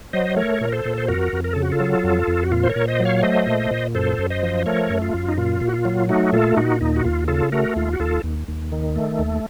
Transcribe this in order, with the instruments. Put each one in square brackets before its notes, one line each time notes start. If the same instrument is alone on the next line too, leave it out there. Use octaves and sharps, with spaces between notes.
[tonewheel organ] F#3 C5 D#5
A3 A#4 C#5
A#2 A#4
A4 C5
A#2
C5
F2 F#4 A#4
F2
A#4
C#3 A4
F#4
F4 A4
F#3
F2
F2
F#4
A#2 F4
C5
A#4 C#5
A#2
C5 D#5
F#3
C#5 F5
A3 C5 D#5
A#2
A#2
F#2 A4 C5
F#2
C5 D#5
F3
A3 A#4 C#5
F#2
F4
F#2
D#4
A#2 F4
A#2
F#4
F4
F#3
A3 D#4 F#4
A#2 F4 A4
A#2 D#4 F#4
D#2 D#4
F#4
D#2 F4
C#3 F4 A4
A3 F#4 A#4
D#2 F4
F#4
D#2 F4 A4
D#2
D#2
D#3
A3
D#2